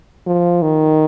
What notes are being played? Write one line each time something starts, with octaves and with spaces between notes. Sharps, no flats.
F3
D#3